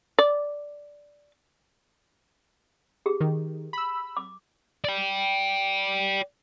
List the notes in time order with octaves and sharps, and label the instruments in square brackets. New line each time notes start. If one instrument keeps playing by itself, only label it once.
[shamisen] D5
[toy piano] G4 G#4
[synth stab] D#3
B5 E6
[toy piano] D6
[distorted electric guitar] D5 G5